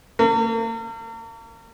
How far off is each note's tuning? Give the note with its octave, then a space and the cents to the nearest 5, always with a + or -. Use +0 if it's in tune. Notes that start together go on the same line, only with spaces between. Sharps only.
A#3 -45